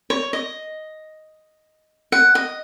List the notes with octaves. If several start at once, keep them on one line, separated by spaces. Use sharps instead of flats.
C#5
D#5
F#5
D#5